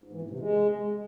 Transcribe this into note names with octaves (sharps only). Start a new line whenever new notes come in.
G#2
E3
A2
C3
G#3